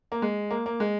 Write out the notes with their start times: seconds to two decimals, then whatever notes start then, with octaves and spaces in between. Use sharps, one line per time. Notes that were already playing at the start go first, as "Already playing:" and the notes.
0.12 A#3
0.22 G#3
0.51 A#3
0.66 A#3
0.80 G#3